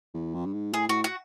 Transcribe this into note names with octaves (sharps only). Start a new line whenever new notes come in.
E2
F2
G2
G#2
A2 G#4
A2 F#4
F#4